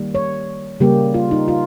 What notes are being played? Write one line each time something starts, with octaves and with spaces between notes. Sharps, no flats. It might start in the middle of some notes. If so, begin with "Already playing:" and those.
Already playing: D#3 G3 A#3
C#5
C#3 G3 A#3 G4
F4
D#4
F4